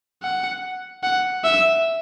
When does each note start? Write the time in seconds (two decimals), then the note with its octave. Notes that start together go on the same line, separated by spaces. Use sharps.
0.23 F#5
1.03 F#5
1.44 E5